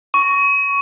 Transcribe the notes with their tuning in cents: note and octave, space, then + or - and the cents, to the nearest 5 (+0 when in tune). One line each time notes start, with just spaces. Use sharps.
C#6 +10